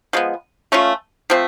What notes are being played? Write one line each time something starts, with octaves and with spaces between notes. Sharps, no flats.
F3 G#3 B3
A3 C#4 F4
F3 A3 C4